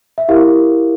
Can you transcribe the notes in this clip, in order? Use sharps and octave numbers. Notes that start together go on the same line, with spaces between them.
E5
E4 G4 A#4 F5